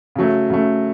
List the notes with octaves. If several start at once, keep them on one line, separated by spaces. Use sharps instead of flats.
C#3 F#3 A3
C#3 F#3 A3